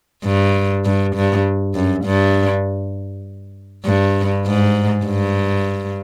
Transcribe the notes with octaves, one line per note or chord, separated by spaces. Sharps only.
G2
G2
G2
F#2
G2
G2
G#2
G2